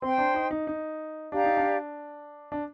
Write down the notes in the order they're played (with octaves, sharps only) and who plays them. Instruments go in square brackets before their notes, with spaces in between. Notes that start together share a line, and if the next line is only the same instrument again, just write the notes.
[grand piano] C4 [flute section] C5 G5 C6
[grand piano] D4
D#4
D#4
D#4
[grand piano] D4 [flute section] G4 D5 F5 A#5
[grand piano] D#4
D4
D4